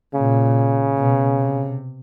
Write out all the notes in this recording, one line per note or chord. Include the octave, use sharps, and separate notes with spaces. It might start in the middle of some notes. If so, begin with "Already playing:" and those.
A#2 C#3
B2
C3